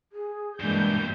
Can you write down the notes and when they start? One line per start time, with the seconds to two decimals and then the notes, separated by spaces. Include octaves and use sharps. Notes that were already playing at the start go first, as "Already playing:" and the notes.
0.12 G#4
0.60 G2 B2 E3 G#3 A#3 D4 G6